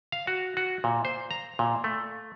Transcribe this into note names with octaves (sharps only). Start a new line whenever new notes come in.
F5
F#4
F#4
A#2
C5
A#5
A#2
A3